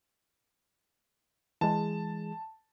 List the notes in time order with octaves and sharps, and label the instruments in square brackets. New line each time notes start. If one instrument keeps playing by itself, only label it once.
[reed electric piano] E3 G#3 G#4 [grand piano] A5